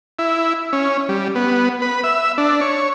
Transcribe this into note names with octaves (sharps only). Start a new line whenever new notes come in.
E4
C#4
G3
B3
B4
E5
D4
C#5